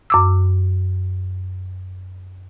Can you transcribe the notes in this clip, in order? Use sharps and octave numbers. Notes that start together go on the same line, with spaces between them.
F#2 D6 E6